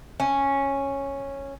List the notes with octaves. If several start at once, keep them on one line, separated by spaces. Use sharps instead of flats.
C#4